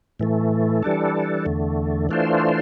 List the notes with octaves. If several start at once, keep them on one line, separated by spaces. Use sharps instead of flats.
A2 E3 A3
E3 G3 D4 A4
E2 D3 A3
E3 A3 D4 F4 C5